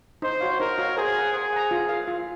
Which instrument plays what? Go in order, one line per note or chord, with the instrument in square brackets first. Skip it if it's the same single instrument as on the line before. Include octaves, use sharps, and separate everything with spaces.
[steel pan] D#4 [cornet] C5
[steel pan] F#4 C#5 F5
[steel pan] D#4 [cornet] A#4
[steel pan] F#4 C#5 F5
[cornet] G#4 [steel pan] C5
[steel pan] F#5 A#5
[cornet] G#4 [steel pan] C5
[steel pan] F#5 A#5
F4
A#4 F5
F4